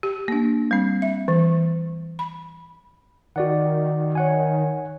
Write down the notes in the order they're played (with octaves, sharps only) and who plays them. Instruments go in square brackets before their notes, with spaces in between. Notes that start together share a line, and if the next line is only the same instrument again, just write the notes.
[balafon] G4
[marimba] A#3 D4
G3 C4
[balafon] E5
E3
B5
[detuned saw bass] D#3 [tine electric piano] F#4 D5 F#5
[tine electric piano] C#5 F#5 G#5